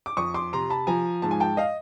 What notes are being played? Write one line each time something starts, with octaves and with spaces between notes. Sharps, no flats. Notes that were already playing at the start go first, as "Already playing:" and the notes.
D6
F2 C#6 D#6
C6 D6
C3 A#5 C6
A5 B5
F3 G#5 A#5
G#2 A5
G#5
G5 A5
D#5 F5